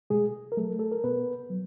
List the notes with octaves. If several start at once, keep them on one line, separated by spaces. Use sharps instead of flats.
B2 G#3 G#4
A#4
F#3 A3 A4
A4
A#4
B2 B3 B4
F#3